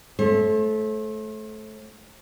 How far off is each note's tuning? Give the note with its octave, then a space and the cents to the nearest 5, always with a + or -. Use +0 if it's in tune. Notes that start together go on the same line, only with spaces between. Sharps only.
A3 -20 C5 +45